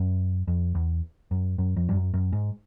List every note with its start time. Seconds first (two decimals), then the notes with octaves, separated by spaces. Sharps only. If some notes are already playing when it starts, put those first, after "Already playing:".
Already playing: F#2
0.47 F2
0.75 E2
1.31 F#2
1.58 F#2
1.76 F2
1.89 G2
1.95 F#2
2.14 F#2
2.32 G#2